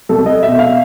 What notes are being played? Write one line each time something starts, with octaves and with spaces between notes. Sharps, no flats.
C2 A4
D#5
B2 E5
F5